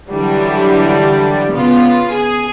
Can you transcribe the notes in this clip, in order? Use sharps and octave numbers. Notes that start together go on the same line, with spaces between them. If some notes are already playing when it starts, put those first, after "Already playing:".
D3 E3 F#3 G3 D4
C#3 B3 F4
G#4